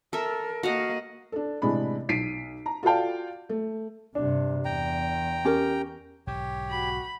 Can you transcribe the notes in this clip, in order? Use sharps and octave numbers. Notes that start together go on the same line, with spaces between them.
A4 A#4 E5
A#3 F#4 D#5 F5 F#5
D4 A4
A1 C3 G#3 D4 B5
B1 B6 C7 D7 D#7
A#5
F4 F#4 A4 D5 F5 G5
A3
G2 C3 D4
E2 G5 A#5
C#4 G4 A#4
B1 G#2 D3 G4 C#5 G5
F#4 B5